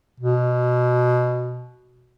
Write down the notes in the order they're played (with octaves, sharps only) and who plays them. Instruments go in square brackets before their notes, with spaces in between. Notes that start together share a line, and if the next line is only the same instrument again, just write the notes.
[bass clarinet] B2